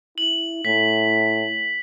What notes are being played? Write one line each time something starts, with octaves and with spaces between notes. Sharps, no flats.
E4 F#7
A2 B6